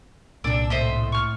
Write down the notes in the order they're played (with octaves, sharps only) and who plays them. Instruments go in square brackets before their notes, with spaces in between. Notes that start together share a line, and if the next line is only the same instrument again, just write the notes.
[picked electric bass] C2 A#2 [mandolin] D4 D5 [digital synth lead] E6
[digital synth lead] A2 [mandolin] C5 D#5 E5
[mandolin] C#6 F6